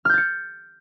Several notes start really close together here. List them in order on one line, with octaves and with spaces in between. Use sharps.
F6 G6 A6 C#7